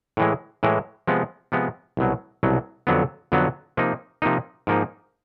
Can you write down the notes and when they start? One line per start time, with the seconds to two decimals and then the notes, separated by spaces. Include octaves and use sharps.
0.17 A2 E3 G#3
0.63 A2 E3 G#3
1.07 C3 F3 G#3 B3
1.52 C3 F3 G#3 B3
1.97 C2 B2 F#3
2.43 C2 B2 F#3
2.87 F2 D3 F#3 B3
3.32 F2 D3 F#3 B3
3.77 C3 F3 A#3 D#4
4.22 C3 F3 A#3 D#4
4.67 G#2 F3 A#3 D#4